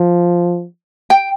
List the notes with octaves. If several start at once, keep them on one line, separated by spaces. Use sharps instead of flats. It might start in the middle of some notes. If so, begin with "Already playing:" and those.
Already playing: F3
G5